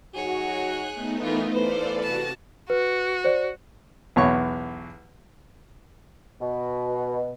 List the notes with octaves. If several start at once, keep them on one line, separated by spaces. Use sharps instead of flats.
F#3 D#4 F#4 G#4 C#5
F#6
A3 B3 D#4
E3 F4 A#4
E3 A4 B4 C5 D5 F5
C3 F#4 A5 A#6
F#4 B4
C5 D5
B1 E2 C#5 C#6
B2